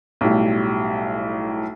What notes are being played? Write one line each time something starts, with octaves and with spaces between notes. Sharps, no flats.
B1 A2 G3